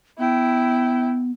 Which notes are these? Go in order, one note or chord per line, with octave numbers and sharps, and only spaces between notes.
B3 E4 G5